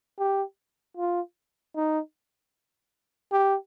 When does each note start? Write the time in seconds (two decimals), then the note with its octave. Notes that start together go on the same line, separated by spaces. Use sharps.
0.19 G4
0.97 F4
1.76 D#4
3.32 G4